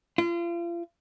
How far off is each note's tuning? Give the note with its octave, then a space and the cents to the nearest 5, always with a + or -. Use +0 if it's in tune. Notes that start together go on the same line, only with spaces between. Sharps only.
F4 -35